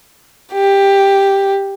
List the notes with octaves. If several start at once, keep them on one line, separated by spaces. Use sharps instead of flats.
G4